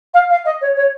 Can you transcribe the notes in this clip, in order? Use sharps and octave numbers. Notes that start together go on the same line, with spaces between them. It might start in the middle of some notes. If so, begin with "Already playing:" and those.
F5
F5
D#5
C#5
C#5